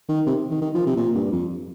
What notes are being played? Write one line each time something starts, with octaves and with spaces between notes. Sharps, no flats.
D#3
C3
D#3
D#3
F3
C3
A#2
G2
F2